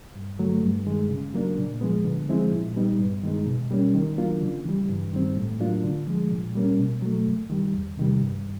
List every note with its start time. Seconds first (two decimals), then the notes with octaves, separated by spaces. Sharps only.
0.15 G2
0.39 D3 F#3 A3
0.63 G2
0.87 D#3 G#3
1.10 C#3
1.34 F#3 A#3 D4
1.58 A#2
1.81 F3 G#3 B3
2.05 D3
2.29 F3 G#3 C4 E4
2.53 A#2
2.76 G3 B3 D#4
3.00 G2
3.23 D#3 G#3 B3 D#4
3.47 B2
3.71 G3 A#3 C#4
3.95 D#3
4.18 F#3 A#3 D4 F4
4.41 C#3
4.65 E3 G3
4.89 G2
5.13 D#3 G3 C4
5.37 A2
5.60 F#3 A#3 D4 F4
5.84 D3
6.07 F3 G#3
6.31 A#2
6.55 G3 A#3 C#4
6.79 B2
7.02 F#3 A3
7.26 F#2
7.50 D#3 G3
7.74 E2
7.97 C3 D#3 G3
8.21 G2